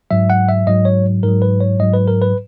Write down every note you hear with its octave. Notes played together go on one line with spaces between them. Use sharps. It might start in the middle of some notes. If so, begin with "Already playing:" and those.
G#2 F#3 E5
F#5
E5
G#2 F#3 D#5
C#5
G#2 F#3 A#4
B4
C#5
G#2 F#3 D#5
B4
A#4
B4